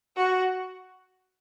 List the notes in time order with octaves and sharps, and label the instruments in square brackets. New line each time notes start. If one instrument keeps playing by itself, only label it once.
[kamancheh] F#4